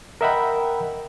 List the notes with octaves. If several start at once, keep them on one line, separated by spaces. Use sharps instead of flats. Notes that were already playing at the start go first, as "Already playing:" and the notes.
A#4 D#5 E5 F#5 G5 B5